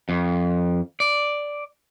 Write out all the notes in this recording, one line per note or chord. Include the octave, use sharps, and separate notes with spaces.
F2
D5